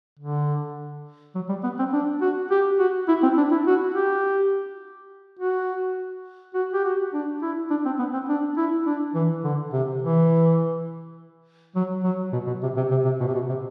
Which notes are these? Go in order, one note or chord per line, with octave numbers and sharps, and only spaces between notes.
D3
F#3
G3
B3
C4
D4
F#4
G4
F#4
E4
C4
D4
E4
F#4
G4
F#4
F#4
G4
F#4
D4
E4
D4
C4
B3
C4
D4
E4
D4
E3
D3
C3
E3
F#3
F#3
B2
B2
C3
C3
C3
C3
B2
C3
B2
C3